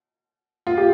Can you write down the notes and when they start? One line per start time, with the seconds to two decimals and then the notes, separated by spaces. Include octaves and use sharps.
0.67 F4
0.77 G4